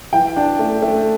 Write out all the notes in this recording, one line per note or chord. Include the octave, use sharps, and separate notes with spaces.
E3 G5
D4
A3
A3